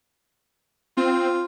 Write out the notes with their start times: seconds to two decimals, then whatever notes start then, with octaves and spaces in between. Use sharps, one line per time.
0.97 C4 F4